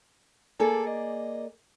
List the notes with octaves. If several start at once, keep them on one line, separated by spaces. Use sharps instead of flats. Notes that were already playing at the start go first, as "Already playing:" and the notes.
A#3 G#4 A4 D5
D#5